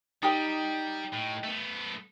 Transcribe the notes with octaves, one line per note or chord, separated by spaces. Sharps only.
G3 D#4 G4 D#5
A2
A3 B3